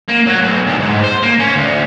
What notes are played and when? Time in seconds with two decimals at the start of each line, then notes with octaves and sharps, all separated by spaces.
0.08 A#3
0.26 F#3
0.41 B1
0.66 D2
0.79 G#2
1.04 C5
1.22 A#3
1.39 C#4
1.56 D2